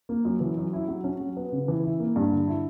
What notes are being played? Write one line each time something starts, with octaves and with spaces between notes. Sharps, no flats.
A#3
F#2
E3
F#2
E4
F#3
C#4
F#3
B3
C#3
E3
E4
A#3
G2
D3
E4